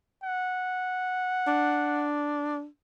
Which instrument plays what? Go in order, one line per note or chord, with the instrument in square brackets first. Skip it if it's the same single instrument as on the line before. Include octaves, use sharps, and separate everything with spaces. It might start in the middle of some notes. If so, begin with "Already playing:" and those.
[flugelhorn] F#5
[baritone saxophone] D4